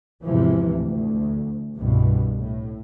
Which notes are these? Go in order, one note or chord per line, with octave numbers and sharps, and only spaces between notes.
E2 G#2 C3 E3 F3
D2
C2 G2 B2
A2